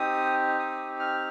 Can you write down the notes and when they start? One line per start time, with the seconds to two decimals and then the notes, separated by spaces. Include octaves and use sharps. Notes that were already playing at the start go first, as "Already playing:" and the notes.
Already playing: C4 D#4 G4 D#6
0.59 D#6
1.00 F6